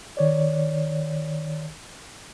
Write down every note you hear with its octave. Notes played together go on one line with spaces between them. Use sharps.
D#3 C#5 D5